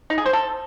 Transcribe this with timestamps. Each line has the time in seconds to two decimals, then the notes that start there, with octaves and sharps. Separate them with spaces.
0.10 D#4
0.18 G#4
0.26 C5
0.33 A4